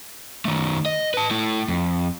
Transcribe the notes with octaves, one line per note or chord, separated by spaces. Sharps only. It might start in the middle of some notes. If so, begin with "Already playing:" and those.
D#3 A3
D#5
B4 A5
A3 E4
F2